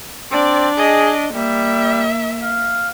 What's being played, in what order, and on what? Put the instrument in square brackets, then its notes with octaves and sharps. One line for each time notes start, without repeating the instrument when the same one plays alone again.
[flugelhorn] C4 [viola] D4 [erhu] D5
[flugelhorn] G#4 [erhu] D#5
[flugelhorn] G3 [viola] A#3 [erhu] E5
[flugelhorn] F5